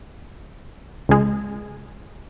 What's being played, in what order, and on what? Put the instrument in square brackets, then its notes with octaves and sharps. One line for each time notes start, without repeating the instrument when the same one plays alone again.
[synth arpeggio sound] C#2 G#3